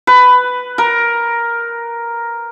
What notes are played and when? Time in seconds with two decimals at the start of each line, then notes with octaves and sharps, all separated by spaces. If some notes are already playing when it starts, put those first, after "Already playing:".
0.07 B4
0.78 A#4